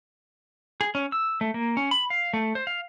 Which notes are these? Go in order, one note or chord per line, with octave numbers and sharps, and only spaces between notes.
G#4
C#4
E6
A3
A#3
C#4
B5
F5
A3
C5
F5